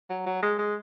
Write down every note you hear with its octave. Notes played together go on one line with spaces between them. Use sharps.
F#3
F#3
G#3
G#3